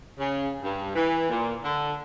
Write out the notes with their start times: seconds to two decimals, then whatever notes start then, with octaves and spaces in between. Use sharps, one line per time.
0.19 C#3
0.62 G2
0.95 E3
1.29 A#2
1.64 D3